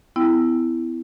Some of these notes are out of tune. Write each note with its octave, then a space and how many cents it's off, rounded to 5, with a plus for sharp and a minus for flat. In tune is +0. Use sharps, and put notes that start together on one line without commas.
B3 +40 E4 +0 G5 +0